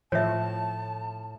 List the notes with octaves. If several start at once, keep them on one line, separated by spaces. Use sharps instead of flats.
A2 F3 C#5 E5 A5